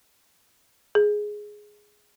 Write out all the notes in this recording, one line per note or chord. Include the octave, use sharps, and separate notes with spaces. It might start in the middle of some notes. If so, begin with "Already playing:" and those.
G#4